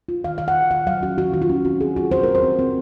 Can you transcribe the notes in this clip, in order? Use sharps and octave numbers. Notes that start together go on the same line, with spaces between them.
F4
D#3 F5
D#3 F5
F#5
F4
D#3 F#5
F#3 F5
C#4 F#4
D#3 F#4
D#3 F#4
F4
C#4
C4 F#4
F4 G#4
F4 F#4
C4 C5
C4 A#4
C5
C4
C4